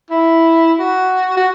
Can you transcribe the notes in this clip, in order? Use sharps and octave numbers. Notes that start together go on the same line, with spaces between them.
E4
F#4
F#4